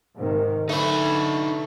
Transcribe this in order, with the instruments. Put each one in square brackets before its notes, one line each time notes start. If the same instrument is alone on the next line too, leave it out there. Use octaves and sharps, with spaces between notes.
[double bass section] G#2 C3 D#3
[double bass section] D3 [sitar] A3 [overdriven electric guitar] D#4 B4